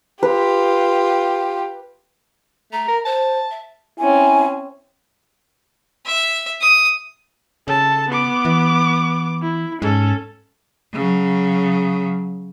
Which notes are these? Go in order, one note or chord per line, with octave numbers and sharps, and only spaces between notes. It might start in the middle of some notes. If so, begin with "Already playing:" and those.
F4 G4 B4
A3 A#5
A#4
C5 A5
E5
C4 C#4 E4 G#5
E5
D#6
C#3 A4 A5
B3 D6
E3
E4
G#2 C#4 A4
C#3 F#3